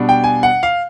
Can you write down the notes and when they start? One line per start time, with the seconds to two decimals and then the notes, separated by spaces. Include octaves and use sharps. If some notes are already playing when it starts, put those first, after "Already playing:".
Already playing: B2 G3 B3 D4
0.09 G5
0.24 G#5
0.43 F#5
0.63 F5